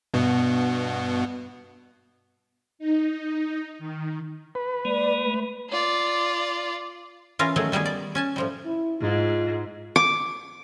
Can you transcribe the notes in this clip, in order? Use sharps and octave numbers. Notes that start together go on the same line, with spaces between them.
G2 B2 B3
D#4
D#3
B4
G#3 A#3 D5
A3
F4 D5
E3 C#4 F4 A#4 F5
D#3 F#3 A3 G#4
D#3 G3 B3 G#4
D5
C#4 G#5 A5
A2 F3 G3
E4
G#2 F4
D6